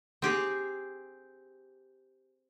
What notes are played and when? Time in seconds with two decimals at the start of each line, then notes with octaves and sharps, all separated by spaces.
0.22 C4 G4 G#4